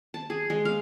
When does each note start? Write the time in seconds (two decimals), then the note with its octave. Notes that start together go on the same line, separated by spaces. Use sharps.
0.14 A5
0.30 G#4
0.50 G#3
0.65 F5